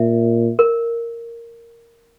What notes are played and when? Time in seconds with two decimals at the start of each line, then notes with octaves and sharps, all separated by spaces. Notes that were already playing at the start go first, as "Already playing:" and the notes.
Already playing: A#2 E5
0.59 A#4